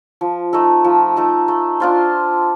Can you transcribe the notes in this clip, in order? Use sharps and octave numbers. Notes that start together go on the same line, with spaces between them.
F3
A3 D#4 A4
F3
A3 D#4 A4
A3
D4 F4 C5